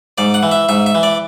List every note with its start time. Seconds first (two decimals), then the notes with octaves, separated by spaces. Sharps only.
0.18 G#2 D5
0.34 F#5
0.43 E3
0.51 E5
0.69 G#2 E5
0.86 E5
0.95 E3
1.03 D5